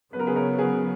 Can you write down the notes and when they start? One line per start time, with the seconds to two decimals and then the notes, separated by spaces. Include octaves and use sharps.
0.13 C#3 F#3 B3 B4
0.19 A#4
0.27 G#4 B4
0.36 A#4 C#5
0.58 G#4 B4